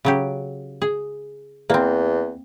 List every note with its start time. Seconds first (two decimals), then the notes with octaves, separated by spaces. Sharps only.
0.05 C#3 F#3 G4
0.82 G#4
1.70 E2 A#3 C4